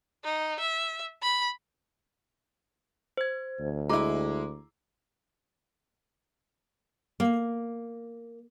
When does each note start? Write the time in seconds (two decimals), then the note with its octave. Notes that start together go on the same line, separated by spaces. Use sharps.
0.24 D#4
0.60 E5
1.23 B5
3.17 C5 G#6
3.60 D2
3.90 G#3 E4 A#5 D6
7.20 A#3